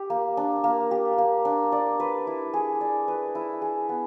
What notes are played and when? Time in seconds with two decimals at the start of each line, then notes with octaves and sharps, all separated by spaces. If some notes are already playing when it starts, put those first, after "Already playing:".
Already playing: G4
0.10 A#3
0.37 D4
0.64 A#3
0.91 G4
1.18 A#3
1.45 D4
1.72 D5
2.00 B4
2.27 E4
2.54 G#4
2.81 D5
3.08 B4
3.35 E4
3.62 G#4
3.89 B3